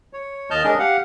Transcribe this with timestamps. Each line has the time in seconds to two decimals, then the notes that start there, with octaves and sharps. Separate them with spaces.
0.13 C#5
0.51 D#2 D#5 A5 F6 G6
0.64 G#3 C#4 D4 A#4 D#5
0.79 G4 F5 F#5